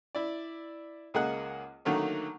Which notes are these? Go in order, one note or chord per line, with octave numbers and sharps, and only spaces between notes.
E4 D5
C#2 A#3 G#4 D#5 F#5 F#6
D3 D#3 F#3 A3 A#3